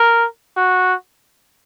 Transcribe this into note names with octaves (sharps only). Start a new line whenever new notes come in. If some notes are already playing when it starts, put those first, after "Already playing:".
Already playing: A#4
F#4